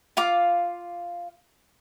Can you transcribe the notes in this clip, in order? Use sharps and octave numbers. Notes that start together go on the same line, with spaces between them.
F4 F5 D6